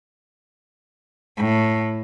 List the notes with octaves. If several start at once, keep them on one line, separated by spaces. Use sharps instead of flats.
A2